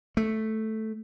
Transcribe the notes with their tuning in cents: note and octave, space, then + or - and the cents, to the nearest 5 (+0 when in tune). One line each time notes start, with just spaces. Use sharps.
A3 -5